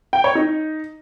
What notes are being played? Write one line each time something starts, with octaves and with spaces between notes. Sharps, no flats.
G5
C#5
D#4